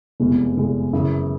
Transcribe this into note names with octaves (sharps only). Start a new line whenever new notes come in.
F1 E2 B2 G#3
F1 E2 B2 G#3
F#2 C#3 E3